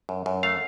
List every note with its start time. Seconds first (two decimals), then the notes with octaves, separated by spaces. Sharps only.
0.09 F#2
0.26 F#2
0.43 A3 F5